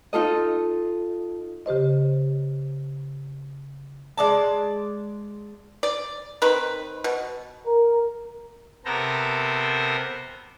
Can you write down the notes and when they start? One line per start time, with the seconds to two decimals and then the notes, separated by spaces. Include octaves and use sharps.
0.13 D#4 F4 A4 D#5
1.66 C#3 G4 C5 D#5
4.18 G#3 D5 A5
5.83 D5
6.42 D#3 C4 B4
7.04 B2
7.66 A#4
8.85 C3 B3 A4 A#4 C5 A#5